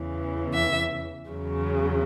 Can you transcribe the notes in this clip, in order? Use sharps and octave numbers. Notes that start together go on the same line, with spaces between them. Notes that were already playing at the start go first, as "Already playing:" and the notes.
Already playing: E2 C#3 E3
E5
E2 C#3 F#3